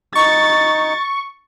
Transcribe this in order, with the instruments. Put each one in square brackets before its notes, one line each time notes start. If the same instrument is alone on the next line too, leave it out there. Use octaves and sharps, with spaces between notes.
[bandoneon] D#4 [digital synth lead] C#6 [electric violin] A6